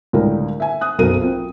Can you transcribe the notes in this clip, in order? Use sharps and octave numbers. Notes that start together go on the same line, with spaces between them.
C#2 A2 D3 G3 A#4
E5 G#5
D#6 F#6
F#1 B1 B2 A4 A#4 D#7
C4 F4